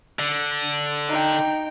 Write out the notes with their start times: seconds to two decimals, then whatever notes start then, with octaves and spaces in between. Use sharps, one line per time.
0.19 D3
1.08 D#4 G5